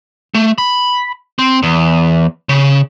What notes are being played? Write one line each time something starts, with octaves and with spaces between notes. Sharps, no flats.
A3
B5
C4
E2
C#3